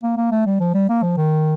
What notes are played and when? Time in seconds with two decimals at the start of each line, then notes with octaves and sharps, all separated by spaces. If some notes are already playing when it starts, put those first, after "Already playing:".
0.03 A#3
0.17 A#3
0.32 A3
0.46 G3
0.60 F3
0.74 G3
0.90 A#3
1.03 F3
1.18 D#3